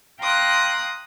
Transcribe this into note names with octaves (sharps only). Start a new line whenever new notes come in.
F5 G5 A#5 C6 D#6 F#6